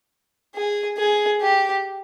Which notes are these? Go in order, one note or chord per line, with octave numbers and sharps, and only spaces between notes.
G#4
G#4
G4